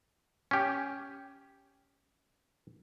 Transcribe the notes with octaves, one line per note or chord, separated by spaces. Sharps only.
C#4 G4